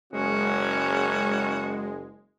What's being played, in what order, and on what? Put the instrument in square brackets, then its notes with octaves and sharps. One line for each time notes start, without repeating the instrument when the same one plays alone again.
[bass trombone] F#1 [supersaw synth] G#3 [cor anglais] C#4 [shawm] F#4